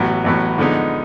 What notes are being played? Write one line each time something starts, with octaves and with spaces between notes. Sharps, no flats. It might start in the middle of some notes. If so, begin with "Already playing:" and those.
Already playing: A1 A2 F#3 B3
A1 A2 F#3 B3
D3 F3 G#3 B3 D#4